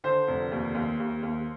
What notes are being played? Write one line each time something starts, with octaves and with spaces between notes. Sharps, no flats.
D3 C5
F1
D#2
D#2
D#2
D#2